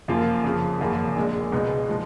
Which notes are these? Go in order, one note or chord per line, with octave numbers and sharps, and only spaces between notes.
F#2 F3 A#3 F4
F2 C#3 F3
G#1 F#2 C#3 F3 A#3
A#1 A#2 G#3
C#2 B2 G#3 B3 D#4
F3 G#3